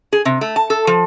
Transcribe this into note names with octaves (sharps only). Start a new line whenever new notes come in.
G#4
C3
A3
A5
A4
F3